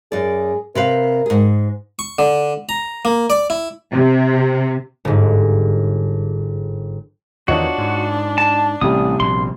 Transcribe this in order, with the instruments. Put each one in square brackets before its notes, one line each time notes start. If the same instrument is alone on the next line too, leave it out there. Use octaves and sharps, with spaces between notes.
[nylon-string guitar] F#2 D5 [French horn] G#4
[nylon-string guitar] C3 B4 F5 [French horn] A#4
[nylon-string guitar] G#2 G#4
[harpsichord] C#6
D3
A#5
A#3
D5
E4
[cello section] C3
[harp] G1 G#2
[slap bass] E2 D#3 E3 [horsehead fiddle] D4 [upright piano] F4 C#5 D#5 [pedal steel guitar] F#4
[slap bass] G#2
[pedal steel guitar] A5
[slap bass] A1 [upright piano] C3 G3 [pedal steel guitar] D#6
[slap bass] A#1 B2 [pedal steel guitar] C6